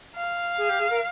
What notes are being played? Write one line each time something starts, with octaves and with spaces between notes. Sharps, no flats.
F5
G#4
G4
G#4
A#4